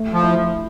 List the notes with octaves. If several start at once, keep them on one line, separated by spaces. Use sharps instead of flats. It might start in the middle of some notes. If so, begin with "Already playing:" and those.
Already playing: A3
F3
E4